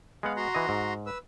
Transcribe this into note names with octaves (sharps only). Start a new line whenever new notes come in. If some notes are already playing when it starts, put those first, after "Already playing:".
G#3 B3 F5 F#5
F#4 A#5 C6
E3 D#5
G#2
B4 E6